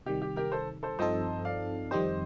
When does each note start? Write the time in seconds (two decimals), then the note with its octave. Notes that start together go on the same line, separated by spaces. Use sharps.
0.06 C3 D#3 G3 G4
0.22 G4
0.36 G4 A#4
0.52 A4 C5
0.83 A4 C5
0.99 G2 F3 C4 D#4 A4 C5 D#5
1.45 D5 F5
1.91 F2 D#3 G3 C4 G4 C5 D#5